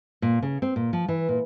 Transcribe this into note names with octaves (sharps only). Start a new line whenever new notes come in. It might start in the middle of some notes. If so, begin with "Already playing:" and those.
A#2
C#3
C4
A#2
F3
E3
A#2